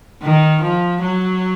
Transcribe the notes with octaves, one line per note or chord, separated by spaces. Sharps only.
D#3
F3
F#3